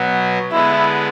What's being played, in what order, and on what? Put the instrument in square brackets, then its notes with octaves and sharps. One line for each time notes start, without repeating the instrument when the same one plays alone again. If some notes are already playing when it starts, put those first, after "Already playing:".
Already playing: [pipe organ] B2 F#3 B3
[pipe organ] D3 G#3 B3 [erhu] E4